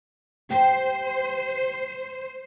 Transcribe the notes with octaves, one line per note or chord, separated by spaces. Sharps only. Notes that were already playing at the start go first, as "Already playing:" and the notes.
G4 C5